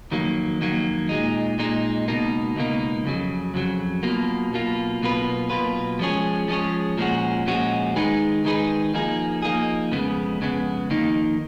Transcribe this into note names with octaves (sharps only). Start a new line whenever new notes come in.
F2 D#3 F#3 A#3
F2 D#3 F#3 A#3
A#2 G#3 D#4
A#2 G#3 D#4
C#2 B2 A#3 D#4
C#2 B2 A#3 D#4
F2 C#3 F#3
F2 C#3 F#3
B1 B2 A#3 F4
B1 B2 A#3 F4
B1 B2 A#3 F4 B4
B1 B2 A#3 F4 B4
F3 G#3 C#4 G#4 C#5
F3 G#3 C#4 G#4 C#5
A#2 F3 G#3 C#4 F#4
A#2 F3 G#3 C#4 F#4
D#3 G#3 D#4 G#4 B4
D#3 G#3 D#4 G#4 B4
F3 A#3 D#4 G#4
F3 A#3 D#4 G#4
F2 C#3 G#3 B3
F2 C#3 G#3 B3
F2 D#3 A#3 D#4